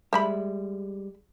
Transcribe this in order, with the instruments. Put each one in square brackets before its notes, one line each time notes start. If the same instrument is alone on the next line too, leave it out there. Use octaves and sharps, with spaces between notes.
[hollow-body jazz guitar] G3 G#3 [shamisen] C5 E5 B5